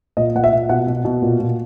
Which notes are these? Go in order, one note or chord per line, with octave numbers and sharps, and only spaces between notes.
A#2 D#5
A#2 F#5
E5
A#2
B2 F#5
B2
B2
A#2
A#2